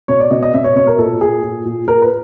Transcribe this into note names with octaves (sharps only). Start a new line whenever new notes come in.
B2 C#5
D5
B2 D#5
D#5
B2 E5
C#5
B2 C#5
A#4
A#2 A4
A#2 G#4
A#2
A#2
A#2 A#4
B4